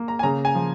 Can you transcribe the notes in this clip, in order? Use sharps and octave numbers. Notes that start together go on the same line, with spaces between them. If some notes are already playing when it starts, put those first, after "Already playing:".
Already playing: A#3
A#5
G#5
C#3 A#5
G#5
F3